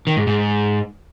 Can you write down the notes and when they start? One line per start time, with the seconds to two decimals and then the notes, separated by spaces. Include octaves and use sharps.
0.07 D#3
0.17 G#2
0.27 G#2